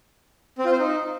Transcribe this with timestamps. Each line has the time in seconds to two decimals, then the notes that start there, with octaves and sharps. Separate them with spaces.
0.58 C4
0.65 F4
0.72 C5
0.79 D#4